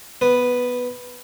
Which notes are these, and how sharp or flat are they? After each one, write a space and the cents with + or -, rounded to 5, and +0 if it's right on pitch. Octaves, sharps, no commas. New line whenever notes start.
B3 +0 B4 +0